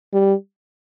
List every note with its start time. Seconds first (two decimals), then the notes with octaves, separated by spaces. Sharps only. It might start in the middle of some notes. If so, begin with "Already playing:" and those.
0.13 G3